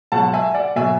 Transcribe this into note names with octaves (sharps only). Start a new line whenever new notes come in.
C#2 B2 F#3 F#5 A5
E5 G#5
D5 F#5
B2 F#3 E5 G#5